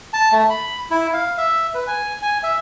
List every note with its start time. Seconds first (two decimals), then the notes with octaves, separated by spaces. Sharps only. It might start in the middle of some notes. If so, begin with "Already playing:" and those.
0.13 A5
0.32 A3
0.50 B5
0.90 E4
1.13 F5
1.38 E5
1.74 B4
1.87 G#5
2.22 G#5
2.43 E5